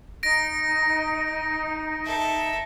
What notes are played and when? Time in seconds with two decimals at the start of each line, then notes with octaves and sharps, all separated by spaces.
0.23 D#4 A#6 D7
2.06 A4 E5